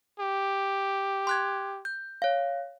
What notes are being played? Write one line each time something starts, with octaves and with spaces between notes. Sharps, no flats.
G4
C6 F#6 G#6
G6
C#5 F5